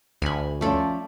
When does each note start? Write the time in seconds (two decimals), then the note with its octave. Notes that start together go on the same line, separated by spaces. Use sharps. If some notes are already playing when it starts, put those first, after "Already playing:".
0.22 D2 G#5 B5
0.61 F3 A3 C#4 F4 A4 D5